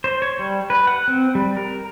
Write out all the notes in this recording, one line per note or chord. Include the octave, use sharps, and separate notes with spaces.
C5
C#5
G3
B4
F#5
C4
G3
A#4